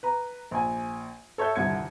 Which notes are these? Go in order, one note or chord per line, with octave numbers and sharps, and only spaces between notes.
B4 A#5
A#1 G#5
A4 C#5 E5 G6
D#1 C2 D3 G#6 C#7